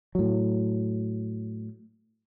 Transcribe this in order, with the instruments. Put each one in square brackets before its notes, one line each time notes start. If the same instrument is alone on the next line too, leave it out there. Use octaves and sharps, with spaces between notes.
[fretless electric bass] A2 F#3